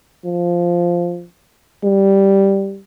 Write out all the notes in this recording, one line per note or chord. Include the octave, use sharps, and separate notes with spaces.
F3
G3